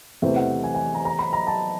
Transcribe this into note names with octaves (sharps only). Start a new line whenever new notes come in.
E2 C3 E3 A3 C4 E5
F#5
G#5
G#5
A#5
A#5
B5
A#5
A5